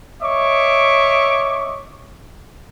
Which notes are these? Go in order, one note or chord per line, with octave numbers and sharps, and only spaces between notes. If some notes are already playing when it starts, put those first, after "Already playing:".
C#5 D#5 E5 C#6 D6